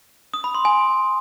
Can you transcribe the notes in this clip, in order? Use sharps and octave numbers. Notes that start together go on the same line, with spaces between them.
D#6
B5
C6
G#5